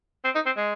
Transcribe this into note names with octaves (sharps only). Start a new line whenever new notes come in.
C4
D#4
C4
G#3